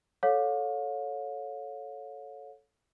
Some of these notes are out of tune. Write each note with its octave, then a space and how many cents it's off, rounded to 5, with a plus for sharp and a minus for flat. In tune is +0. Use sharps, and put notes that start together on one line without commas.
A4 -10 C#5 +0 F5 +40